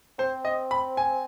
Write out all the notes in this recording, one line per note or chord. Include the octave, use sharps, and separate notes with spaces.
C4 C5
D#5
B5
G#5